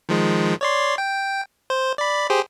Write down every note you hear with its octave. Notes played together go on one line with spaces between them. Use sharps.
D#3 F3 G#3
C#5 D5 C6
G5
C5
D5 B5
G4 G#4 C5